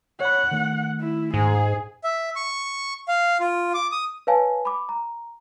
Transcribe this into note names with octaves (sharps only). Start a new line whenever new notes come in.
C#5 F#5 B5
D#3 A3
E4
G#2 G#4
E5
C#6
F5
F4
D6
D#6
B4 C#5 F5 G#5 A5
B5 D6
A#5